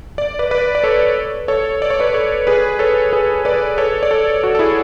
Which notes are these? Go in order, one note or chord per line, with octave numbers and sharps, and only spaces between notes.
D5
B4 D5
B4 D5
D5
A4 C#5
A4 C#5
D5
C#5
B4 D5
A4 C#5
G#4 B4
A4 C#5
G#4 B4
B4 D5
A4 C#5
D5
A4 C#5
F#4 A4
A4
E4 G#4